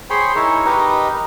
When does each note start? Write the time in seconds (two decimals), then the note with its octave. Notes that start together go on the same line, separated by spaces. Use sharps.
0.10 G#4 C5 C#5 G5 B5 C6
0.36 D#4 E4 A#4 C#5
0.66 D#4 G4 A#4 B4 D#5